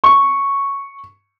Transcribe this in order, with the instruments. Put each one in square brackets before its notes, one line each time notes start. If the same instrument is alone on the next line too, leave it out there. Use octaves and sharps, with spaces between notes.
[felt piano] C#6